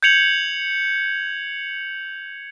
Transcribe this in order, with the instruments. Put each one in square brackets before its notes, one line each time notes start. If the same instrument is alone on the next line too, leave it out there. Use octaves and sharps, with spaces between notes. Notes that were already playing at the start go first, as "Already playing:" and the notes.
[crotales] G6 G#6 C#7 F7 F#7